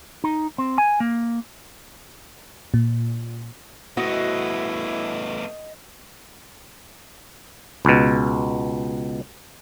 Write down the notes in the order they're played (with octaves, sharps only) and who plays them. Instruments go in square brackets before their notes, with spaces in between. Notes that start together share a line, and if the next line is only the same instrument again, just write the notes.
[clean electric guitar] D#4
C4
G#5
A#3
[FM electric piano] A#2
[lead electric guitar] A3 B3 [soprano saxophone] E4 [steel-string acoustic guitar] F#4 [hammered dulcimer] D#5
[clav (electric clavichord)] C#2 B2